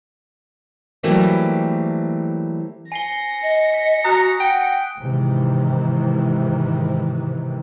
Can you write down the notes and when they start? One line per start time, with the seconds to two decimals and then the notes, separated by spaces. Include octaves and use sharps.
1.03 E3 F#3 G3 A3 A#3 C4
2.92 G#5 A#6 C7 C#7 G7
3.43 D#5
3.74 B6
4.04 F#4 A#5 D#6 F#6
4.40 F#5 G5
4.99 G#2 C3 D#3 E3